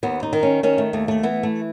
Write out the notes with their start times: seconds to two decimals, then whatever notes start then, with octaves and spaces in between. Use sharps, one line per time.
0.03 D#2 B3
0.23 D#4
0.33 D#3
0.43 C#4
0.63 D#3 C#4
0.78 A3
0.93 D#2 A3
1.08 A3
1.23 E3 B3
1.43 A3